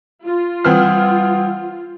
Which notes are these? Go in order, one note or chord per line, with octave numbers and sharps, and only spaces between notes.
F4
E3 G3 C4 F#5 D#6 F6